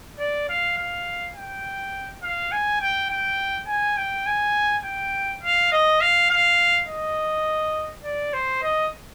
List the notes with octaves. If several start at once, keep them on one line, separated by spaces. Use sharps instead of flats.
D5
F5
F5
G5
F5
G#5
G5
G5
G#5
G5
G#5
G5
F5
D#5
F5
F5
D#5
D5
C5
D#5